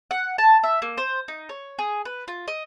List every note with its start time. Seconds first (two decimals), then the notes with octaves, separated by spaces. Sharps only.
0.11 F#5
0.38 A5
0.64 E5
0.82 A#3
0.98 C5
1.28 D#4
1.49 C#5
1.79 G#4
2.05 B4
2.28 F4
2.48 D#5